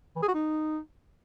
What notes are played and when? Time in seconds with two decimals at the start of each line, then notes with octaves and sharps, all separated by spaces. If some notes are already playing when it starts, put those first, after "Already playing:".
0.16 E3
0.22 G#4
0.28 F#4
0.34 D#4